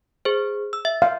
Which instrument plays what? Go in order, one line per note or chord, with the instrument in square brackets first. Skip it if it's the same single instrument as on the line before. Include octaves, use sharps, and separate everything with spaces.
[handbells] G#4 C5
E6
E5
[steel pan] F5